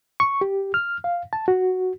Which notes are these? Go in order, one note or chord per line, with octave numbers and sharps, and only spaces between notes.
C#6
G4
F6
F5
A5
F#4